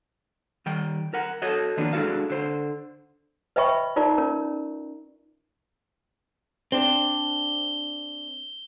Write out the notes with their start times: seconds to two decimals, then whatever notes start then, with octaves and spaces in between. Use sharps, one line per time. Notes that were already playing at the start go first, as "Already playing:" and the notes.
0.66 D#3 G3 G5
1.13 A#4 F#5
1.42 F#4 A4 C#5 D#5
1.77 D#3 F3 A#3 B3 D4
1.93 G#3 D4 E4 F#4 A4 F5
2.30 D3 C5
3.56 B4 D#5 E5 G5 B5 C#6
3.96 D#4 F4 A#4 D5 A#5
4.18 C#4 A#4
6.72 C4 D4 G7